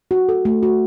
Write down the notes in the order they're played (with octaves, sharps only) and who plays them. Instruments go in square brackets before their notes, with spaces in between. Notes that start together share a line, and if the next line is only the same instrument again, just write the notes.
[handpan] F#4
A4
A3
F#4